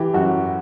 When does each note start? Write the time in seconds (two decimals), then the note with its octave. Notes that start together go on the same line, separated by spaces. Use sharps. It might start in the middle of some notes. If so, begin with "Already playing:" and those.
Already playing: E3 G4
0.14 F#2 F#4